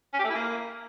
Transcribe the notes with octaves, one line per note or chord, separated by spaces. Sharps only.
C#4
G4
A3
E4
A#3